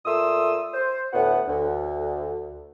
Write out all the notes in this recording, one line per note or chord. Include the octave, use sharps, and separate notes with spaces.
A#2 A3 C6 D#6 E6
C5
D2 A2 B3 F#5
D2